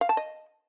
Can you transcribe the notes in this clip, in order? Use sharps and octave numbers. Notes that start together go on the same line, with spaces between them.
F5
A5
D#5